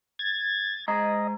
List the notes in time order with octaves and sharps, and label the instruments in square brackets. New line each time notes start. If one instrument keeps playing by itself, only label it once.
[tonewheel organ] G#6 A6
[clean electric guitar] G#3 A#5 [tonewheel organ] D#5